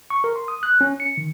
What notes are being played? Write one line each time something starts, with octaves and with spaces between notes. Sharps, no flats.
C#6
A#4
C6
D#6
F#6
C#4
C#7
D#3